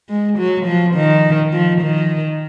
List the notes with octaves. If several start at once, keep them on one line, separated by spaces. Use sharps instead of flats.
G#3
F#3
F3
D#3
F3
D#3